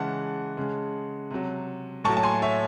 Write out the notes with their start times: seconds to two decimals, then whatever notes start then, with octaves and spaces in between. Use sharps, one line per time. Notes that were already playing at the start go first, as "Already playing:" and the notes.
Already playing: C#3 E3 G#3 F#5 A5
0.57 C#3 G#3
1.31 C3 F#3
2.04 A2 A5 C#6
2.09 F#3
2.17 A5
2.23 G#5 C6
2.42 C#5 E5